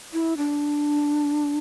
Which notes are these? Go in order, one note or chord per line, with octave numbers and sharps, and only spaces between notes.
E4
D4